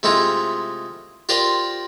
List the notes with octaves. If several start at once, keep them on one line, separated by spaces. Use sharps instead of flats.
C3 G#3 A3 E4 F4
F4 G4 A#4 C5 D5